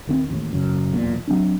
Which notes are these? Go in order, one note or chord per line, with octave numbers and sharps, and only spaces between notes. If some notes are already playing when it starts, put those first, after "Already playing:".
D#1 D#3 C4
A1 D#2 A2
D#1 F#2 C#3
D1 B1 E2 A#2
F#3 C4 D4